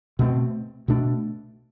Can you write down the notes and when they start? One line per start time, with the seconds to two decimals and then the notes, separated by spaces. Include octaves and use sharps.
0.19 B2 A3 C4
0.88 B2 A3 D4